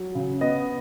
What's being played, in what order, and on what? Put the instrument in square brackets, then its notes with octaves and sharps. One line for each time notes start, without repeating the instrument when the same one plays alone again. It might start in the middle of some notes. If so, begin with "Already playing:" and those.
Already playing: [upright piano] F#3
C#3
B3 D#5